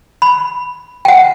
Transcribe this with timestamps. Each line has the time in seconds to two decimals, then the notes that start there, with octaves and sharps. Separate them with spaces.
0.22 B5
1.05 F#5 G5